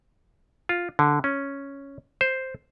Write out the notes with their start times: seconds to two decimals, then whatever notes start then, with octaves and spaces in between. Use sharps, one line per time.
0.69 F4
0.99 D3
1.24 C#4
2.21 C5